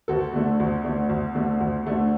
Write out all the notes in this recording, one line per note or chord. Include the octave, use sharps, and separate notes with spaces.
D2 F#4 A4
D3 A3 D4
D2
D3 A3 D4
D2
D3 A3 D4
D2
D3 A3 D4